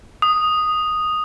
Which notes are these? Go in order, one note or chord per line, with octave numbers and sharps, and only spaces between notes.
D#6